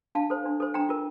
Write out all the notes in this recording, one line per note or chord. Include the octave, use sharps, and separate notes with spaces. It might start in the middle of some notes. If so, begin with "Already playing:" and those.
D4 F5 A5
A4 C5
D4
A4 C5
D4 G5 A#5
F4 A#4